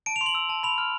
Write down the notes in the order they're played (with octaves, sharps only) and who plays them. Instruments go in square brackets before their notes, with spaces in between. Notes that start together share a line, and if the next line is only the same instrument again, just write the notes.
[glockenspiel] A5 D7
F7
C6
F#7
E6
A5
B5 F7
F6